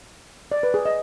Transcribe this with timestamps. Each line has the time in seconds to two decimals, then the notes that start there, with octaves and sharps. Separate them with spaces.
0.52 D5
0.63 B4
0.74 G#4
0.86 D#5